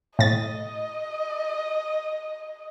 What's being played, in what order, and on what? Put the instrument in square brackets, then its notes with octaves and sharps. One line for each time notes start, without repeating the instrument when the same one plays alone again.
[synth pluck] A2 A6 [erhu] D#5